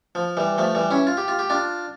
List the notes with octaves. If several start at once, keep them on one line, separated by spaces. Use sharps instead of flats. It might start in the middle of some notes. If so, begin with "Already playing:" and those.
F3
E3 G3
F3 A3
E3 G3
C#4 E4
F4
G4
F4
G4
D4 F4